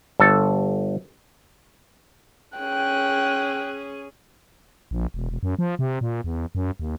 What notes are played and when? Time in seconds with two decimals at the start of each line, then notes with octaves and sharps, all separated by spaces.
0.20 G1 A4
2.58 C#4 G#4 G5 F#6
4.91 A#1
5.14 E1
5.29 E1
5.43 F#2
5.59 F3
5.79 C3
6.01 A#2
6.24 E2
6.55 F#2
6.80 D#2